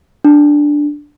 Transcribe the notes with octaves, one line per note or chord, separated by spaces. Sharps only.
D4